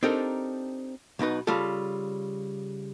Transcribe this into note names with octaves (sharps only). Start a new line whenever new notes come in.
C4 D4 D#4 G4 A4 A#4
B1 B2 D#4 B4
C#3 G3 F4 A4